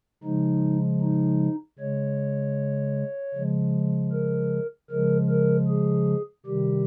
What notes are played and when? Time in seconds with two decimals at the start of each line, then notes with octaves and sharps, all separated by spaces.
0.24 C#3 F3 G#3 D#4
1.02 D#4
1.79 C#3 G#3 C#5
3.35 C#3 F3 G#3
4.12 A#4
4.90 C#3 F3 G#3 A#4
5.29 A#4
5.68 G#4
6.46 C3 D#3 G3 G4